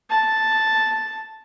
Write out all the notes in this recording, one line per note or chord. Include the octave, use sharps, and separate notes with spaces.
A5